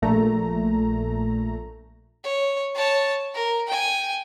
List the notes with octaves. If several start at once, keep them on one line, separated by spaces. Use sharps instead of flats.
A#1 A#2 A3 A#5
C#5
C#5 A5
A#4
G5 G#5